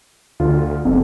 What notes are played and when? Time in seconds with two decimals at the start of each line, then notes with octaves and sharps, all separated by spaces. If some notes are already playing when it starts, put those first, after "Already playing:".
0.40 D2 F4
0.85 F#1 F2